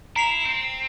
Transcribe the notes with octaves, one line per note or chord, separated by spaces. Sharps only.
E4 A#5 C7 F7
C4